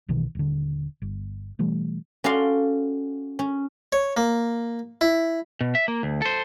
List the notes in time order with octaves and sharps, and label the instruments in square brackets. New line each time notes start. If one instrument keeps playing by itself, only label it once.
[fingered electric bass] B1 B2 D#3 E3
D#1 D3
G1
B2 E3 G3 A3
[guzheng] C#4 F#4 A4 D5 F5 C6
C#4
[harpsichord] C#5
A#3
E4
[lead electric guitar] B2
E5
A#3
D2
A4 C5